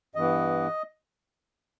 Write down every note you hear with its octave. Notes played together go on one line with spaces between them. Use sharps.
G2 E3 B3 D#5